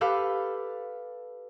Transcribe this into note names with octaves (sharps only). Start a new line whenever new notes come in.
G4 A4 B4 F5